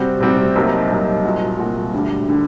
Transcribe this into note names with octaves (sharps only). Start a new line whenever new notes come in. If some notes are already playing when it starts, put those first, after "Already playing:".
Already playing: C3 G3 C4 F#4
C3 G3 C4 F#4
C2 C3 F#3 A#3 D#4
C2 C3 F#3 A#3 D#4
C2 A#2 F#3 A#3 F#4
C2 A#2 F#3 A#3 F#4
D2 D3 G3
D3 G3